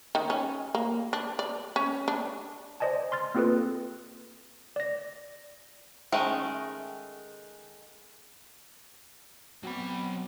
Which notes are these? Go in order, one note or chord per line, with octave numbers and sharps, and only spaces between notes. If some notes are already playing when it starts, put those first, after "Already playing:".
D#3
C#4
A#3
D4
D5
C#4
D4
C5 D5 D#5 G#5 A5
C6 F6 A6
A#3 C4 F4 G#4 A4 B4
D5 A#6
D#3 G#3 A3 C#4
F#3 B3 C4 F#4 B5